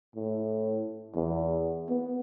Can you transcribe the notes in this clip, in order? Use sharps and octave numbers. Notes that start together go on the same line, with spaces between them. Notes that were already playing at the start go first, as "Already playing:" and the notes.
A2
E2
B3